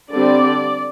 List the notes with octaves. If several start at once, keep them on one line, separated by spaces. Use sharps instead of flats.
D3 G3 C4 D5